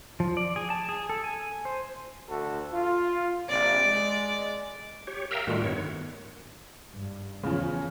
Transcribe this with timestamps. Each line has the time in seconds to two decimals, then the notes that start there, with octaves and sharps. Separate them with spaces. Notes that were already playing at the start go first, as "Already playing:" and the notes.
0.20 F3
0.37 D5
0.56 G#4
0.70 A5
0.89 G#4
1.09 A4
1.24 G#5
1.65 C5
2.29 D2 F#4 A4
2.72 F4
3.49 A#1 C3 D5
3.85 G#3
5.07 G4 C#5
5.31 A#4 E5 F5 G5 A#5 E6
5.47 A2 D#3 G3 A3 F4 F#4
5.64 G2 D#3 B3 C#5
6.95 G2
7.43 E2 C#3 F3 C#4